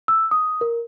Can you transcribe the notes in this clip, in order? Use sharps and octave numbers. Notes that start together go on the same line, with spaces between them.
E6
D#6
A#4